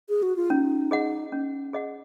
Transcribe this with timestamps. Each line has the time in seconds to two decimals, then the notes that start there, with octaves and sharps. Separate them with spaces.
0.09 G#4
0.23 F#4
0.36 F4
0.50 C#4 D#4
0.91 G#4 D#5 F#5
1.32 C#4
1.73 G#4 D#5 F#5